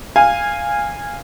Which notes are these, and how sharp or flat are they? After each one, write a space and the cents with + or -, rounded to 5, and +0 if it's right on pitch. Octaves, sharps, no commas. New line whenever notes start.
F5 -5 G#5 -15